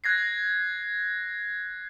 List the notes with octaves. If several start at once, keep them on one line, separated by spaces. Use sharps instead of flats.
F#6 G#6 A#6 C7